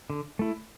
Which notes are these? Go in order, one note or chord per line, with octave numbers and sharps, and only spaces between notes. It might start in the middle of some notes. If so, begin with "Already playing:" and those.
D3
A3 E4